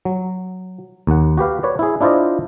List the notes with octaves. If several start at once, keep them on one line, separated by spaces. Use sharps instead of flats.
F#3
D#2 F#5
F#4 G4 B4 F5
B4 C#5 D5
E4 G#4
D4 E4 F4 C5 D5 D#5